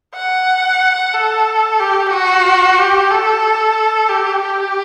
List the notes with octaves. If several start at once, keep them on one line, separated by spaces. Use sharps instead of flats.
F#5
A4
G4
F#4
G4
A4
G4
G4